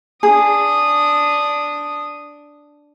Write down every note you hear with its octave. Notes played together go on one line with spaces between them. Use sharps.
D4 G#4 D#6